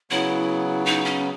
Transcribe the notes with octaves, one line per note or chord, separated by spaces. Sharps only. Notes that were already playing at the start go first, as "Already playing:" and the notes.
C#3 F#3 B3 E4
D#4
C#4